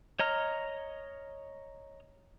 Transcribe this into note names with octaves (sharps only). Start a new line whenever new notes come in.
C#5 D#5 A#5 F6